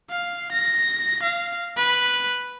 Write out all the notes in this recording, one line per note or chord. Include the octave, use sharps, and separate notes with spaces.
F5
A#6
F5
B4